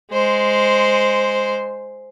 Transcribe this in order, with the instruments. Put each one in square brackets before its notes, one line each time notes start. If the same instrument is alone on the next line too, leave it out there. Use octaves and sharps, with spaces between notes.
[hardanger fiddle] G#3 C5